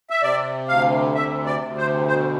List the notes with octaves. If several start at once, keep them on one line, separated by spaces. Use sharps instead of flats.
E5
C3 D5
D2 F5
C3 E5
D5
D2
C5
B2 C5